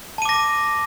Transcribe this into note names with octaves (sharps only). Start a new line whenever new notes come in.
A5 D6 A#6 D#7